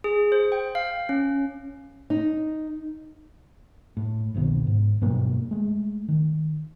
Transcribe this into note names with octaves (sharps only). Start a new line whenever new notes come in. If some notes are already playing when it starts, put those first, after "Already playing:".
G#4
C5
G5
F5
C#4
D#4
A2
G1 C2 B2 D#3
G#2
G2 B2 F#3 A#3
G#3 A3
D#3